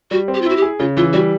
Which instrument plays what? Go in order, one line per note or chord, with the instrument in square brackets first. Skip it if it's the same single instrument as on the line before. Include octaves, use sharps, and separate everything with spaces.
[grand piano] G3 [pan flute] F#4
[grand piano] C4
[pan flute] G4
F4
[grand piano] E4 [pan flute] F#4
[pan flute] G4
[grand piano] G#4
[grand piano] C#3 [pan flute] F4
[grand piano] E3 [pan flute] F4
[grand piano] G3 [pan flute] F#4